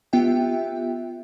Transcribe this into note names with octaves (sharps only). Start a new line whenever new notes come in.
B3 F4 G4 E5 G5